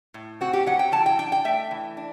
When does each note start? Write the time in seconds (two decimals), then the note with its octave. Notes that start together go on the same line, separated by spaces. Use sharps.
0.14 A2
0.41 C4 F#4
0.53 G4
0.66 F#3 F#5
0.79 G5
0.92 E3 A5
1.06 G5
1.19 D4 G5
1.32 G5
1.45 A3 E5
1.71 E3
1.97 D4